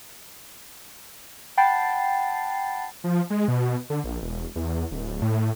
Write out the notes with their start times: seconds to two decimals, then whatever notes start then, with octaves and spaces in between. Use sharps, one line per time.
1.57 F#5 G5 A5 B5 A6 C7
3.04 F3
3.30 G#3
3.48 B2
3.90 D3
4.04 A#1
4.22 E1
4.56 E2
4.91 D1
5.22 A2